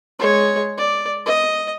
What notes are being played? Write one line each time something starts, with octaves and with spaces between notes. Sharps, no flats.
G#3 C#5
D5
D#5